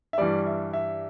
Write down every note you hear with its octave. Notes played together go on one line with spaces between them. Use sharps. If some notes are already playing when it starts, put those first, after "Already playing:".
E5
G2 E3 G3 D5
E5
E5